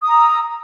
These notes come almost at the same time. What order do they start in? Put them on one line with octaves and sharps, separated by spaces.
D#6 A#5 E6